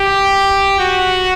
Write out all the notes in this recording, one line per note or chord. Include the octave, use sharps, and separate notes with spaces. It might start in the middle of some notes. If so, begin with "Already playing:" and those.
Already playing: G4
F#4